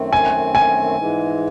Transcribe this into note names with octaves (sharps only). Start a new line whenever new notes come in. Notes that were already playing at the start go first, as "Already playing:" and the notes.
Already playing: F#2 D#3 A3 C4
G#5
G#5
G#2 E3 G#3